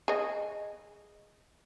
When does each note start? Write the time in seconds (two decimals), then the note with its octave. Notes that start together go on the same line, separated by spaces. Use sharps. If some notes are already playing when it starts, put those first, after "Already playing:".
0.08 G#4 D#5